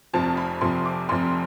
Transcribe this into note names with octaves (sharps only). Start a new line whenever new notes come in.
F1 F2 C3 F3 A5
B5
F1 F2 C3 F3 C6
D6
F1 F2 C3 F3 C6